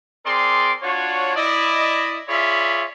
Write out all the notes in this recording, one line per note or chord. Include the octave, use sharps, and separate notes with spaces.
C4 G#4 A#4 D5 C6
D4 F4 F#4 C#5
E4 D5 D#5
F4 G#4 C#5 D5 E5 B5